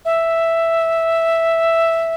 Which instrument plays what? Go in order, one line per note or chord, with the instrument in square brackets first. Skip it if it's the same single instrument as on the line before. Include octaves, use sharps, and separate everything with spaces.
[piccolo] E5